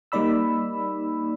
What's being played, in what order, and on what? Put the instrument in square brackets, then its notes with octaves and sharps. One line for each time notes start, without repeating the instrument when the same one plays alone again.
[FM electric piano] G3 A#3 D#4 D5 B5 E6